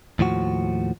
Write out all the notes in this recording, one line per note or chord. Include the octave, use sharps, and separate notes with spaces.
D#2 A2 F3 F#4